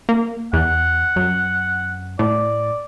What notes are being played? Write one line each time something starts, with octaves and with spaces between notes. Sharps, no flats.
A#3
E2 F#5
F#2
A2 D5